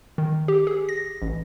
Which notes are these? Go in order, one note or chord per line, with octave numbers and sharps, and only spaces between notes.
D#3
G4
G#4
A#6
A1